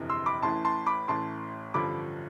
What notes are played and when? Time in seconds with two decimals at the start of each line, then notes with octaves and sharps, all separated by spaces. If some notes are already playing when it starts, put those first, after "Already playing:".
Already playing: G1 F2 C3 E3
0.10 C6 E6
0.26 B5 D6
0.42 A1 A2 E3 A5 C6
0.65 A5 C6
0.86 B5 D6
1.08 A1 A2 E3 A5 C6
1.74 A1 G2 D3 F3 B5 D6